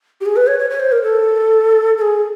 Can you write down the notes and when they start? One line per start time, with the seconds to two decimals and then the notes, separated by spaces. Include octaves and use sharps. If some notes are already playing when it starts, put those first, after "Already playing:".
0.21 G4
0.26 G#4
0.36 B4
0.47 C#5
0.59 C#5
0.70 C#5
0.80 C5
0.92 A#4
1.02 A4
1.98 A4
2.02 G#4